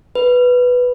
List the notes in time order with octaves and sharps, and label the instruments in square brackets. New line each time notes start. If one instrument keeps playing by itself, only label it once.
[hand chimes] B4